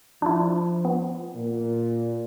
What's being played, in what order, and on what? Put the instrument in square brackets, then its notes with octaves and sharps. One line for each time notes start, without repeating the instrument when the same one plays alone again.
[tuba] F3 [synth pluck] D4 E4
[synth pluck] B3
[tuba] A#2